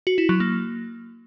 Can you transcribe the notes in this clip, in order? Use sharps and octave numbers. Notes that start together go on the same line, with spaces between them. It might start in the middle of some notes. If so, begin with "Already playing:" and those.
F#4
E4
F#3
A#3